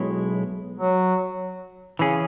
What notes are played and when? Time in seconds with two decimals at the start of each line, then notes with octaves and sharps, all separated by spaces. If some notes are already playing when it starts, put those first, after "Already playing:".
Already playing: B1 B2 G#3 E4 C#5
0.79 F#3
1.99 C#3 E3 C#4 G#4